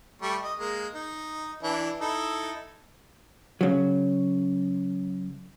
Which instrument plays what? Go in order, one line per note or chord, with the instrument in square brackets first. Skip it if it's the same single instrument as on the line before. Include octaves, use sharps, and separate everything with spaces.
[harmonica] G3 A3 C#6
D#5
G#3 A#3
D#4
E3 D4 E4
D#4 E4 A4
[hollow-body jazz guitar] C#3 F#3